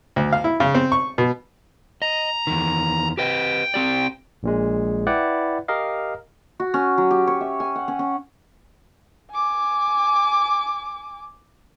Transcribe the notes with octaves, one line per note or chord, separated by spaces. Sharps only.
D2
F5
E4
C#3
C4
C#6
B2
D#5 A#5
E2 D#3
G4 B4 D#5 G5
C4 G4 D5
A#1 A#2 G#3
E4 B4 D5 F#5 G5
G4 A#4 D#5 F5
F#4
C#4
F#3
G4
C#5
E5
G#5
F#5
C#4
C#4
G#5 D6